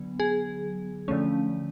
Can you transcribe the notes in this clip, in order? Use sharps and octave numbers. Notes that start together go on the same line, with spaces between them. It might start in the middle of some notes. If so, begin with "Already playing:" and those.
Already playing: D3 F#3 B3
G#4
D3 F3 A3 C#4